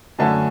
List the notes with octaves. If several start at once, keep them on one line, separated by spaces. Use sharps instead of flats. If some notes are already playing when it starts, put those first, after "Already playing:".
F#2 D3 A3 C#4 A5